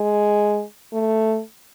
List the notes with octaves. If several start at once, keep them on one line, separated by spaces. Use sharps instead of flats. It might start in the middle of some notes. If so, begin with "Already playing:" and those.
Already playing: G#3
A3